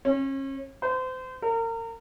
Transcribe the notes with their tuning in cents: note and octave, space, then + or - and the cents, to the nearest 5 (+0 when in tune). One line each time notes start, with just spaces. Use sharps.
C#4 -35
C5 -30
A#4 -35